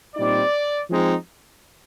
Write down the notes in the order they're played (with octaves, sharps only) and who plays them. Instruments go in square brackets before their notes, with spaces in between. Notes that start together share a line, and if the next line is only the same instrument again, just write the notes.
[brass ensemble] A#2 G3 C4 D#4 D5
F3 G#3 C4 D#4